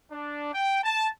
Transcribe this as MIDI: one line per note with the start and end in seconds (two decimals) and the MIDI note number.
0.12 0.50 62
0.53 0.79 79
0.84 1.07 81